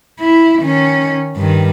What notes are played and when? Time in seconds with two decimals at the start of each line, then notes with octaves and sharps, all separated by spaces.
0.20 E4
0.61 D#3 C#4
1.36 G2 D#3